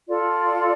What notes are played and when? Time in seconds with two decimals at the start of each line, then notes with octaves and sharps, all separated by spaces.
0.07 F4 A4 D5